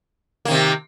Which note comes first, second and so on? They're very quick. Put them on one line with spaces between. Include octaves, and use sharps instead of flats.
A#3 D#3 C3